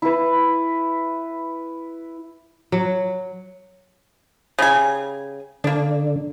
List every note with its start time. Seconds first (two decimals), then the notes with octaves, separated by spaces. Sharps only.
0.02 E4 B4
2.72 F#3
4.59 C#3 G3 G#5
5.64 D3 A#3 D4